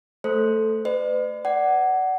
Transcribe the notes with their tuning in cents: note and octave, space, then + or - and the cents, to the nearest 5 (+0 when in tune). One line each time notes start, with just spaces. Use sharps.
A3 +5 A4 +0 C5 +0
B4 +45 D5 +40
D5 +0 F#5 +15